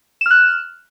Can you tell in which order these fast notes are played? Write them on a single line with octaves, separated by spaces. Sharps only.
E7 F6 F#6